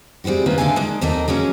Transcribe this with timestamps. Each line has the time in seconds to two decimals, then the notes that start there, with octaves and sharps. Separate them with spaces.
0.24 G3 G#3 C4 E4 F#4
0.46 D#3 A#3 C#4 B4 C5
0.58 D3 G#3 A4 E5 F5 G#5
0.76 G#3 A#3 D4 D#4
1.01 D#2 A3 A#3 C4 A#4 D#5
1.28 F#3 G#3 A#3 C#4